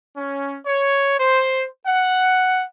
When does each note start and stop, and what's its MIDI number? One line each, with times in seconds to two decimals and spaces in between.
0.16 0.57 61
0.65 1.15 73
1.18 1.63 72
1.85 2.62 78